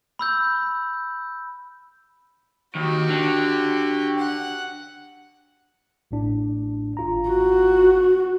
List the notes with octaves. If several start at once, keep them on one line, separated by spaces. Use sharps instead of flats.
B5 E6 G6
D#2 F#4 G4
D3
F#5
A1 A2 D4
G#1 F4 A#5
F#4